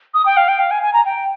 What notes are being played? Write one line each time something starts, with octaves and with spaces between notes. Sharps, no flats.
D#6
G5
F5
G5
F5
G#5
G#5
A#5
G5